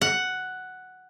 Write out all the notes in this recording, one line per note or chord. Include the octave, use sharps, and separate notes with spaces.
F#5